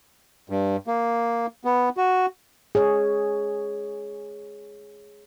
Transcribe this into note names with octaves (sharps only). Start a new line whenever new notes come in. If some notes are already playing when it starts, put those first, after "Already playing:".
G2
A#3
B3
F#4
G#4 C#5